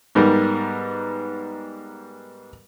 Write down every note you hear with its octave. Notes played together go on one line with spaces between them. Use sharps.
G#2 G3 B3 A#4